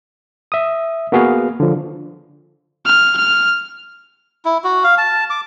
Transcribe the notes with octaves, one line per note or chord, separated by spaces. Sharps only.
E5 D#6
A#3 B3 F#4 G#4 F5
D3 F3
F6
F6
E4
F#4
F5
A5
D6